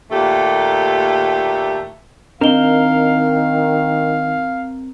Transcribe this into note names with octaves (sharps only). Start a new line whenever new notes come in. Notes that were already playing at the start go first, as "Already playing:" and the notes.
D#2 A#2 A3 G4 A4
D#3 C4 D4 A#4 D#5 F5 G7